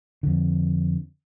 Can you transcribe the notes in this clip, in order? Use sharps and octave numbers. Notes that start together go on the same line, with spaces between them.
F2 D3